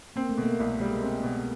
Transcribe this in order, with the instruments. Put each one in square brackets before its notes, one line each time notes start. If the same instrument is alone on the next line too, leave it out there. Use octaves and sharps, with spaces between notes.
[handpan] A#3 [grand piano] C4
[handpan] A3
[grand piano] B2
[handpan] A#3
[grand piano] C2
[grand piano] G3 [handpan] G#3
[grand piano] C4
B2